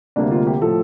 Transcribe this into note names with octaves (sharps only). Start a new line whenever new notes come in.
D2 C3 G3 A#3 D4
F4
G4
A2 F3 A4